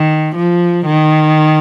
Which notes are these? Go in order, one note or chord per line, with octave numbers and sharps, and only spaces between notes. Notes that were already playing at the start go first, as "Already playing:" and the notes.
Already playing: D#3
F3
D#3